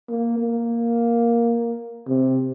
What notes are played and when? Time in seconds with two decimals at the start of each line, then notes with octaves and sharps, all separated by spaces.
0.09 A#3
0.38 A#3
2.08 C3